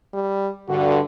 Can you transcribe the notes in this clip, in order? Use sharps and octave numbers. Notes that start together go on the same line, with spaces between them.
G3
G2 D3 F#4